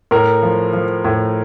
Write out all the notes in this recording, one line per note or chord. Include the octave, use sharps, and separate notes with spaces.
A2 A#4
F3
F3
A2